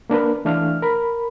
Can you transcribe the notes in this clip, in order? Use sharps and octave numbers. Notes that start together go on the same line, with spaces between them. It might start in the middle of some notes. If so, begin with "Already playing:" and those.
A#3 D4 A#4 B4
E3 A3 D4 F5 F6
A#4 B5